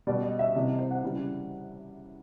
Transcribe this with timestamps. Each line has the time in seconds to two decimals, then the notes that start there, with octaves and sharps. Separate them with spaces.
0.07 B2 G3 D5
0.23 D#5
0.39 E5
0.55 C3 E3 G3 D#5
0.78 C5
0.91 F#5
1.03 C#3 E3 G3